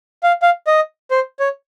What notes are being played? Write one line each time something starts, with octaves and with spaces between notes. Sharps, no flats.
F5
F5
D#5
C5
C#5